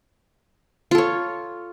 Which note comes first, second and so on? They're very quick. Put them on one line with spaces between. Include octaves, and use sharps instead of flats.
F4 A4 C#5